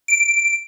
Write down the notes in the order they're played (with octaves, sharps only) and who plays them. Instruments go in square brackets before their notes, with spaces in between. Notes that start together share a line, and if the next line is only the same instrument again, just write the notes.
[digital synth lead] D7